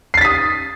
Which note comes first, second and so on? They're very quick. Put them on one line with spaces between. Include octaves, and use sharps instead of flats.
C7 A6 B6 D#6